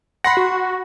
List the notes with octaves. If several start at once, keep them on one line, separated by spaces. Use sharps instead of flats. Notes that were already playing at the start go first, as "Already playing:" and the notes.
F#5 B5 C6 A#6
F#4